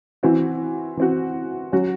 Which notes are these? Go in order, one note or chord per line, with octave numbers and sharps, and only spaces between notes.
E3 C4 F#4
E3 C4 F#4
F#3 C#4 F#4